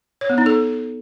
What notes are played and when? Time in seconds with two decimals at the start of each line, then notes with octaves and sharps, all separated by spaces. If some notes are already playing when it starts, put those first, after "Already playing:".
0.21 C#5
0.30 B3
0.38 D#4
0.46 A4